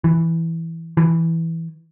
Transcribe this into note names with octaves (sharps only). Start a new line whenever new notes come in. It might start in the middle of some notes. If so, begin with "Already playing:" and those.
E3
E3